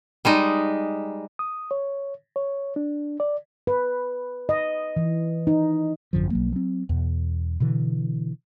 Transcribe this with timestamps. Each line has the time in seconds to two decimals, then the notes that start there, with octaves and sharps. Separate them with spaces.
0.25 G3 G#3 D#4
1.39 D#6
1.71 C#5
2.36 C#5
2.76 D4
3.20 D5
3.67 B4
4.49 D#5
4.96 E3
5.47 D#4
6.13 G#1 F#2 D3 F3
6.31 B1 F#3 A#3
6.52 F#3 C4
6.89 E2 B2
7.60 B2 D3 E3